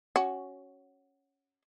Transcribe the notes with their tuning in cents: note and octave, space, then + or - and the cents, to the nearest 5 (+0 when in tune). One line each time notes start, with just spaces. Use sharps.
C#4 +0 F#4 +10